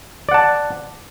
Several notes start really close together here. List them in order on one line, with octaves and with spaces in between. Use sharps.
D5 F#5 A5